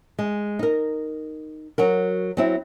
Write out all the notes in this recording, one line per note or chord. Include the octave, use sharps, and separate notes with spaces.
G#3
D#4 A#4
F#3 F#4 A#4
F#3 C4 E4